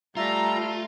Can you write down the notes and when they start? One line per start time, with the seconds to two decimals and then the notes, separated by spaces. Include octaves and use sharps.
0.17 G3 A3 F4 E5 A#5